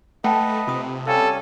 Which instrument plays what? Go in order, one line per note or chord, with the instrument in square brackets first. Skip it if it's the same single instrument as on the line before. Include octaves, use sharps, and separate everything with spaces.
[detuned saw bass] A3 [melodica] B4 D#5 [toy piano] F#5 G5 A5
[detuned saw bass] C3 [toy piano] F4 D#6
[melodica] G3 C#4 G#5 [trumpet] A4 [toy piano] F5